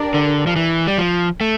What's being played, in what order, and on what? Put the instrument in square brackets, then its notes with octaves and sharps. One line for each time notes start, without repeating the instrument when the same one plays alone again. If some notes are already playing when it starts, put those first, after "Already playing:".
Already playing: [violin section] D4 G4 A#4 D5
[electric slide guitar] D3
F3
E3
G3
F3
A3